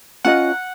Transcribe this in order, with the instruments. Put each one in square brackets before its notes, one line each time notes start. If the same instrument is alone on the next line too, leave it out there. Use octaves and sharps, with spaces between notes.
[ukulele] C#4 F4 A#4 D#5 [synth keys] F#5